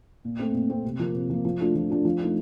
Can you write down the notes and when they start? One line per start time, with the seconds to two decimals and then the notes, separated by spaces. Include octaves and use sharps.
0.24 A#2
0.39 A3 C4
0.54 A#2
0.70 A3 C4
0.85 C3
0.99 F3 A#3
1.14 C3
1.30 F3 A#3
1.45 F3
1.60 A3 D4 F4
1.75 F3
1.90 A3 D4 F4
2.05 F3
2.21 A3 D#4